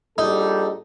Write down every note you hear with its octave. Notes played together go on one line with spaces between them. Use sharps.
A#1 G3 D#4 A4